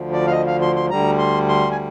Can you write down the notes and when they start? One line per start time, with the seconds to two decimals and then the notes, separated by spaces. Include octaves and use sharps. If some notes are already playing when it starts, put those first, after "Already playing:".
Already playing: D2 D3 F3
0.13 D5
0.27 F5
0.32 D#5
0.47 F5
0.61 C6
0.76 C6
0.90 D2 D3 G3 A#5
1.19 C6
1.49 C6
1.71 G#5